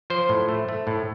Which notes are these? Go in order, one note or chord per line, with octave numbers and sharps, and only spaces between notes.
F3 C5
A2
A3
A3
A2